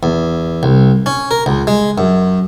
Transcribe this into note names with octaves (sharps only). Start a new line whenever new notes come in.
E2
C2
C#4
A#4
C#2
G#3
F#2